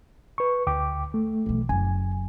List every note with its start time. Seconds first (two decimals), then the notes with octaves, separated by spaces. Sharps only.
0.38 B4 C#6
0.67 D2 G5 D6
1.14 A3
1.46 B1 E2
1.69 F#1 G#5